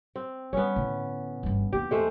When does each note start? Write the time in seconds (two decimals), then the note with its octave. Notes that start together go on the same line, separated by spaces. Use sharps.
0.16 C4
0.53 G3 B3 C#4
0.76 A2 D3
1.43 G1 E2
1.73 D#2 E3 G4
1.91 G#3 A3 C5